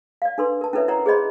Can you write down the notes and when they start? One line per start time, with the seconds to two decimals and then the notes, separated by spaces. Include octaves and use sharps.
0.22 D5 F5
0.38 D4 A4 B4 C6
0.61 A#4 A5
0.73 C#4 E4 A4 B4 C#5 E5
0.88 E4 A#4 C#5 F#5 A#5
1.06 G#4 C5 D5 D#5 B5 C6